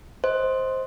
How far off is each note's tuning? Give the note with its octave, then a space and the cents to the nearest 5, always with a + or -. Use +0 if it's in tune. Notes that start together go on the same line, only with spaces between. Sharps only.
C5 +5 D#5 +20